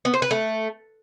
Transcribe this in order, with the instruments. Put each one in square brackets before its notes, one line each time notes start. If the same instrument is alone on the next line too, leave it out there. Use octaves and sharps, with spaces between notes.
[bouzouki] B3
C5
B4
A3